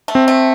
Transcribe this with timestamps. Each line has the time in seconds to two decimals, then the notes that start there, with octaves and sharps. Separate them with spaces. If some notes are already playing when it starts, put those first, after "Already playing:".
0.08 A3
0.15 C4
0.28 A3